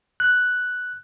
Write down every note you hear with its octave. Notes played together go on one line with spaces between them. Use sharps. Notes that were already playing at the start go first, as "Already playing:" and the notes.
F#6